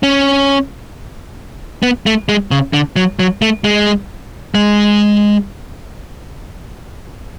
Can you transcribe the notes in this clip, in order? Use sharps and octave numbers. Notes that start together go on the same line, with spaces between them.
C#4
B3
A3
G#3
C#3
D3
F#3
F#3
A3
G#3
G#3